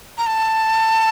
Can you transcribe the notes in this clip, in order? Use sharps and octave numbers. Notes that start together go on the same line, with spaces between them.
A#5
A5